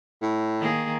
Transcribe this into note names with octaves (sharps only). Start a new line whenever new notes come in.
A2
D#3 A#3 G#4